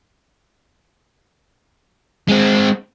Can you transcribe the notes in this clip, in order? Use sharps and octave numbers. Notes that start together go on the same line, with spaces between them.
G#3 C4